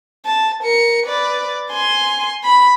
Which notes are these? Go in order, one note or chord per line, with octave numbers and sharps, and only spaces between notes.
A5
A#4 C#7
B4 D5
G#5 C6
B5